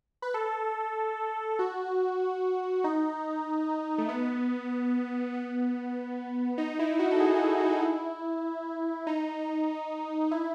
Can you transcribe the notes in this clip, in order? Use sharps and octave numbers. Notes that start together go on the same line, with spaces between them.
B4
A4
F#4
D#4
A3
B3
B3
D#4
E4
F#4
A4
G#4
G#4
F#4
E4
D#4
E4